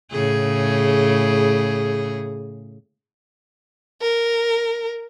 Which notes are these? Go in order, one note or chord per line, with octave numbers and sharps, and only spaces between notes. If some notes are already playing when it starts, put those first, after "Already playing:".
A2 C#3 G#4
A#4